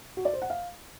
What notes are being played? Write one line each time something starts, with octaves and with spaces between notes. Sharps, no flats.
F#4
D5
C5
F#5
F5